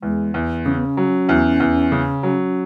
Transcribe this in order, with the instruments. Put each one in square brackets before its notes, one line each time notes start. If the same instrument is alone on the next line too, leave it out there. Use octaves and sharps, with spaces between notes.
[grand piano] E2 [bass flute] G#3
[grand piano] E2
[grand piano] C#3 [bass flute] C#4
[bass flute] B3
C#4
[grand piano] F#3
E2
E2
C#3
F#3